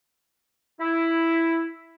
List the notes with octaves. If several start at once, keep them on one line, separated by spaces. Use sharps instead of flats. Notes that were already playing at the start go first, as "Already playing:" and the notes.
E4